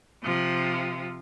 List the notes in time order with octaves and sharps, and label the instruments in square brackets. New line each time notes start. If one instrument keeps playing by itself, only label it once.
[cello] C3 F3